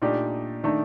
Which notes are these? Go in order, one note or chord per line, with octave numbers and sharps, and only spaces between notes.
A#2 A3 D4 D#4 G4 D5
D#3 A3 D4 D#4